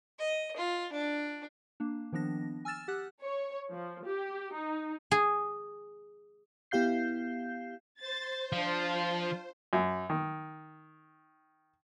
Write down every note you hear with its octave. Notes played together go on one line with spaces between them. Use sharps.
D#5
F4
D4
A#3 D4
D#3 F3 B3 D4 A#6
G#5 E6 F6 A6 E7
G4 F#5 F#6
C#5
F3
G4
D#4
G#4
B3 E4 G4 F5 G6 C7
C5 A6
F3 D4 F4
F#2
D#3